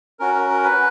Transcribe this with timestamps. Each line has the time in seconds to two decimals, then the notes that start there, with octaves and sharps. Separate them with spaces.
0.19 C#4 F#4 A#4
0.34 A#4
0.49 A#4
0.63 B4